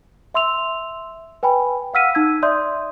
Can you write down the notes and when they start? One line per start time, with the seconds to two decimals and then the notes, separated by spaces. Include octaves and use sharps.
0.34 E5 C6 E6 F7
1.43 B4 G5 G#5 B5
1.94 F5 F#5 E6 F6 B6 D#7
2.15 D#4 E6 G#6
2.42 D5 E5 C6 D#6 G6